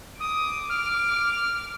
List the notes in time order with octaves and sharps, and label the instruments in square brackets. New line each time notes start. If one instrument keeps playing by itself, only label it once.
[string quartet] D6 [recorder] D#6
[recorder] F6